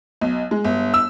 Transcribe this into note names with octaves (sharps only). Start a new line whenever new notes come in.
B1
G#3
G1
E6